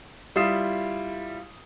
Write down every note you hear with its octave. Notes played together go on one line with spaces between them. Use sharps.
G3 E4 F4 D#6 C7 E7